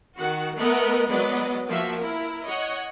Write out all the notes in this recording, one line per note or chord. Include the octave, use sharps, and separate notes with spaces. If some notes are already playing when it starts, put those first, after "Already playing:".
D#3 F#4 F#5
A3 B3 A#4 B4 D#5 F#5
F#3 G#3 B3 B4 D5 D#5
F3 A#3 F#4 E5
E4 A#4
C#5 D#5 F#5